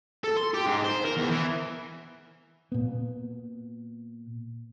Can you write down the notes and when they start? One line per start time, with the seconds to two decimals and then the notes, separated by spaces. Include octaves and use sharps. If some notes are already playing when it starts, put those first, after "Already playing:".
0.24 A4
0.37 C6
0.54 G4
0.66 G#2
0.84 C5
1.05 A#4
1.17 E2
1.30 E3
2.72 A#2 B3